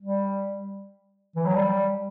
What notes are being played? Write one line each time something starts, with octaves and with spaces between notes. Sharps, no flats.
G3
E3
F#3
G3